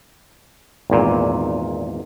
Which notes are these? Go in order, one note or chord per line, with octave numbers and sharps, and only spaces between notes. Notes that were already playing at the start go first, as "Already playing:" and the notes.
G#1 E2 A#2